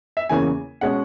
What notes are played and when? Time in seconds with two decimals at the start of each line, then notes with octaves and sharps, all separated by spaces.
0.17 E5
0.29 E2 C#3 E3 A#3 C#4 G#5
0.81 B2 G#3 C#4 F#5